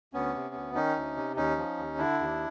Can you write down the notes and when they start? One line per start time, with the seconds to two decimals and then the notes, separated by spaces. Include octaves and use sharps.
0.13 D2 B3 C#4
0.34 C3
0.55 D2
0.75 D#3 C#4 D#4
0.96 D2
1.17 C3
1.36 D#2 C#4 D#4
1.57 F3
1.77 D#2
1.98 D3 D4 E4
2.19 D#2